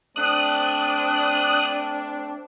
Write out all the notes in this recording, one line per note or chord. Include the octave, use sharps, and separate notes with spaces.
A3 C4 D4 D#6 F#6